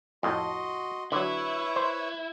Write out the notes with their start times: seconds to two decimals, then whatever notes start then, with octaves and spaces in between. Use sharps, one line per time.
0.23 F2 A2 F#4 D#5 C6
1.12 D3 F#3 E4 B4 C#5
1.76 C5